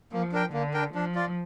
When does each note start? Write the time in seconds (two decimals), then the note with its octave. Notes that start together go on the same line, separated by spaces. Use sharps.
0.12 F3 A#3
0.32 D4 A#4 G5
0.53 D3 A#3
0.74 D4 A#4 G5
0.95 F3 D4
1.15 F4 D5